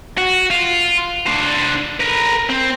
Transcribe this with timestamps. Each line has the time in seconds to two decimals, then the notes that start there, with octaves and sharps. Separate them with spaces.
0.18 F#4
0.50 F4
1.27 D4 C5
2.00 A#4 B4
2.49 C4